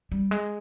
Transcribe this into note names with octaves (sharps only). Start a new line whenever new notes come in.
G3
G#3